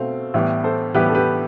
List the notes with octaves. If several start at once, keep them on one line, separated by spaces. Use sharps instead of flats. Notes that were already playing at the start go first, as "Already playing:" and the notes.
Already playing: B2 A3 C4 F5
A2 E3 G3 B3
A4 C5
A2 E3 G3 B3 G4 B4
A4
G4 B4